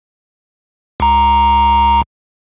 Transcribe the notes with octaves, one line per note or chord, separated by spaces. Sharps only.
C#2 A#5